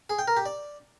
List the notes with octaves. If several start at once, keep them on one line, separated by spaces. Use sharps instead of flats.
G#4
G5
A#4
G4
D5